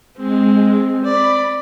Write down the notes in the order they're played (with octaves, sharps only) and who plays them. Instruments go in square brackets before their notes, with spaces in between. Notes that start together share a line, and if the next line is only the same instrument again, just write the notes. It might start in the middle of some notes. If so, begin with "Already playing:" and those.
[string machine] G#3 [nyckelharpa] C4
[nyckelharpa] D5 [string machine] B5